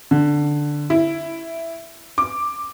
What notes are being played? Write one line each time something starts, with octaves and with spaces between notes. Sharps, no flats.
D3
E4
D6